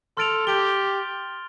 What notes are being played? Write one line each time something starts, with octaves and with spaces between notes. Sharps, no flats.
A4 C6 F6 A6 D7 F7
G4 G6 D7 G7